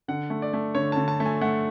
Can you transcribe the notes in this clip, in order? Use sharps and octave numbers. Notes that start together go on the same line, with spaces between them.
D3 F#5
A3
D5
A3
D3 C#5
D3 A5
A5
A3 A5
G#5
A3 F#5